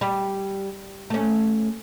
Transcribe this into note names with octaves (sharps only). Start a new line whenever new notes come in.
G3
A3 C#4